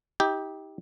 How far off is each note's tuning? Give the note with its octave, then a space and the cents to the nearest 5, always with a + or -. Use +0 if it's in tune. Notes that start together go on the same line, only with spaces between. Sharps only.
D#4 +40 G4 +0